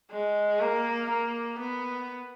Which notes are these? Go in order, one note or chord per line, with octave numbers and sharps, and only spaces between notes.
G#3
A#3
A#3
B3